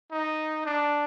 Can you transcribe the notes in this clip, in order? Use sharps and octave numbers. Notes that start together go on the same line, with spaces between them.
D#4
D4